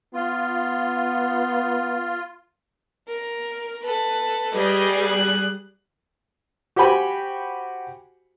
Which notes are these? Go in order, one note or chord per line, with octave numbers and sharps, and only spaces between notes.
B3 F4
A#4
A4 B4
G3 G#4 B4 D#5
F#6
F#4 G4 C5 G5 G#5 B5